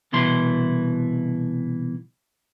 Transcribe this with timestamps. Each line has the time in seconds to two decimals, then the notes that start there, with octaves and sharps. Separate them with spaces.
0.12 C2 B2 E3 E4 C6